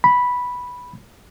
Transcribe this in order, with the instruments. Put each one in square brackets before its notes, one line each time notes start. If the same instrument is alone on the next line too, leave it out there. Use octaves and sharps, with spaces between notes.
[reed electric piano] B5